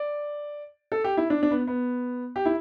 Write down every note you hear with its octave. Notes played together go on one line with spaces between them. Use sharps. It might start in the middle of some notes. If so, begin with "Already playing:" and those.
Already playing: D5
A4
G4
E4
D4
D4
B3
B3
G4
E4